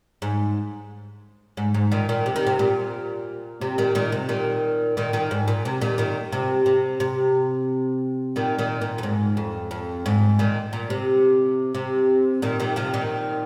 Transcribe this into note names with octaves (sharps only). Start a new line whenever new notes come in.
G#2
G#2
G#2
A#2 D#3
A#2 D#3
C3
D#3
C3
A#2
C3
A#2 D#3
A#2 D#3
C3
A#2 D#3
A#2 D#3
A#2 D#3
G#2
A#2
C3
A#2 D#3
A#2 D#3
C3
C3
C3
A#2 D#3
A#2 D#3
A#2
F2
G#2
F2
F2
G#2
A#2 D#3
A#2
C3
C3
A#2 D#3
A#2 D#3
C3 F3
A#2 D#3